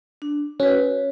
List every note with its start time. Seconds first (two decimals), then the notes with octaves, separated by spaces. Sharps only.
0.22 D4
0.60 C#4 F#4 B4